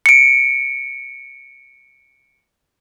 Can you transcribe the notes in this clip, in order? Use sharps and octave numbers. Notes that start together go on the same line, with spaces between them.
C#7 D7